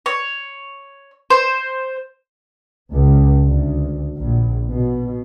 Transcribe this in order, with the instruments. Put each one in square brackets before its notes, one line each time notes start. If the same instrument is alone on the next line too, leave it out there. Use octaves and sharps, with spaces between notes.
[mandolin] C#5
C5
[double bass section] C#2
D2
A#1
B2